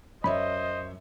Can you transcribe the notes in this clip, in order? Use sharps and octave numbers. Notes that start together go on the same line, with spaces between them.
F#2 C5 C#5 D#5 E5 B5